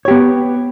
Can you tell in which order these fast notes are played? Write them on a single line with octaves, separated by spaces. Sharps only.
C#5 G4 B3